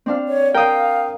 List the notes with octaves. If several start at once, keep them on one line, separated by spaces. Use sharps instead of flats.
C4 D4 F5
C#5
A#4 F5 G5 D#6